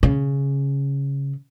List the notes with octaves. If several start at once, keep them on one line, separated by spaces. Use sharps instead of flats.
C#3